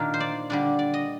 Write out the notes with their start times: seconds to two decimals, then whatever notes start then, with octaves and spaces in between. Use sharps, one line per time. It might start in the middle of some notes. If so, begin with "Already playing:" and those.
Already playing: A#2 D#3 A#3 D4
0.14 C5
0.20 D5
0.50 D3 G3 D4 D5
0.79 D5
0.94 D#5